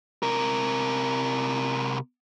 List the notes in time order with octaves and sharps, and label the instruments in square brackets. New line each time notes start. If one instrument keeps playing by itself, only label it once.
[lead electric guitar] C3 A#4